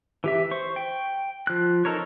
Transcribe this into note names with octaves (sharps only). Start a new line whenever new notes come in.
E3 G4 E5
C5 C#6
G5
F3 F#6
D#4 A4 A#4 C#5